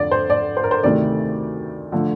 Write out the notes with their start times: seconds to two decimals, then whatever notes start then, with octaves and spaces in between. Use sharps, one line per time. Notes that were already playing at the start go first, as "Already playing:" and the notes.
Already playing: F2 D3 F3 D5
0.11 C5
0.30 D5
0.57 C5
0.64 A#4
0.71 C5
0.83 D2 C3 D#3 A3 C4 D5
1.92 D3 F3 A3